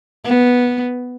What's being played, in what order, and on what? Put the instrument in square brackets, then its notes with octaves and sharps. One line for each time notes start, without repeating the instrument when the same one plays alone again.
[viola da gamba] B3